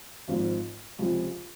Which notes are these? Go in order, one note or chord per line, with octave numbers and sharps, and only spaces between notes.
G#1 G#2 F3
C#2 C3 F3